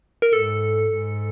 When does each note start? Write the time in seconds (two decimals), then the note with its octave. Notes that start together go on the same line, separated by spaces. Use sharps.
0.22 A#4
0.33 G#2 A4
0.91 G#2